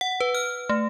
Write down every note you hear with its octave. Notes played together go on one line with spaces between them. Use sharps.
F#5
B4
F6
A3